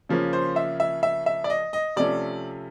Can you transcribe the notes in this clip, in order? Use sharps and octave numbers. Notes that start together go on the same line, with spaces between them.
C#3 F3 A#3 C#4
C5
E5
E5
E5
E5
D5
D#5
D#5
C3 F3 A3 C#4 D5